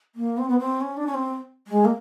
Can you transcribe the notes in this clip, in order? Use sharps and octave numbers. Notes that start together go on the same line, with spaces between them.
A#3
C4
B3
C4
C#4
D4
C#4
C4
G#3
A#3